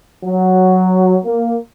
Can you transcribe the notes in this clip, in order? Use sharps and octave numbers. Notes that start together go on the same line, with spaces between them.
F#3
A#3